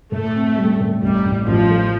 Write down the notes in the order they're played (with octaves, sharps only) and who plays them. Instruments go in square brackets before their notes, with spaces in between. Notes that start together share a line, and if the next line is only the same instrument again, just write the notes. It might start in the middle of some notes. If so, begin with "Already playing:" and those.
[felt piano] A2 [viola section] A3
[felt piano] C4
G3
A2
[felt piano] A1 [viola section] G3
[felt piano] A1
[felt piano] A1 [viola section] F3
[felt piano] A3